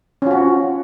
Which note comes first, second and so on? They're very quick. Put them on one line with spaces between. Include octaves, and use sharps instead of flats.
C#4 F4 F#4